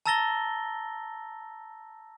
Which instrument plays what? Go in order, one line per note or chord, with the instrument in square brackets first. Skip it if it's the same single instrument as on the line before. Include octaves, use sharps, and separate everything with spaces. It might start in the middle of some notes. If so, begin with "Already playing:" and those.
[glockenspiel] A5 A#5 E6 A6 A#6 G7